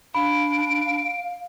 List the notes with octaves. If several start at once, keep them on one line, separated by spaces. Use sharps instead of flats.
D4 F5 B5 D7